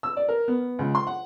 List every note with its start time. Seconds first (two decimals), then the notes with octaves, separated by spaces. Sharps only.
0.03 E6
0.17 D5
0.28 A#4
0.48 B3
0.79 C#2
0.95 C6
1.07 F#5